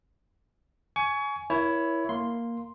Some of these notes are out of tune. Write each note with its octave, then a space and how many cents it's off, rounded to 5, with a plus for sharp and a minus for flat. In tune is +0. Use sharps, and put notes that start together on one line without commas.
G#5 +15 C#6 +25
E4 +0 A#4 +40 C#5 +15
A#3 +0 C6 +0